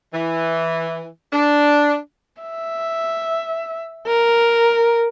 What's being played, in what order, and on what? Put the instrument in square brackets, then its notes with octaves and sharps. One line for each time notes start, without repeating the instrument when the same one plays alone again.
[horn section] E3
D4
[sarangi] E5
A#4